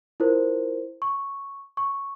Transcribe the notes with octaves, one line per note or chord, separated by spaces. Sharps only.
E4 F4 A#4 C5
C#6
C#6